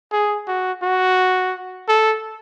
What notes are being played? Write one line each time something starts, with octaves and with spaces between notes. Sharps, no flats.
G#4
F#4
F#4
A4